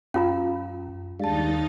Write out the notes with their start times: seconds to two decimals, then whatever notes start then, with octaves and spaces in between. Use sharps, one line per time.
0.14 F#2 C#4 F4 F5 A#5
1.20 D#2 G3 G#3 D4 D#4 F5 A5 A6